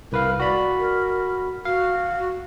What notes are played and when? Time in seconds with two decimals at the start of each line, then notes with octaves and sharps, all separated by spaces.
0.12 C2 A#4 B4 F5
0.39 F#4 D5 B5
0.79 A#4
1.65 F#4 F5